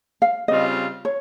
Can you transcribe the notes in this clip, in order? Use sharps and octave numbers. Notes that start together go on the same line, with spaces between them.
F5
C#3 G3 C4 F4 D#5
C#5